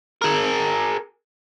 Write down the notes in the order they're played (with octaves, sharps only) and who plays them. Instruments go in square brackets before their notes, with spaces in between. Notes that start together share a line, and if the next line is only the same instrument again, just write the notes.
[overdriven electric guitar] G#4 A#4